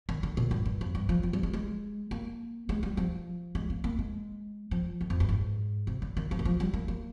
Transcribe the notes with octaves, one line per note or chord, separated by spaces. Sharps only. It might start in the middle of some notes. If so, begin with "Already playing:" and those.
D#3
D3
A#2
G2
G2
F2
G2
F3
F3
G3
G#3
G#3
A#3
G#3
G3
F3
G#3
A#3
A#3
G#3
F3
D#3
F2
G2
G#2
C3
D3
D#3
F3
D#3
F3
G3
A#3
A#3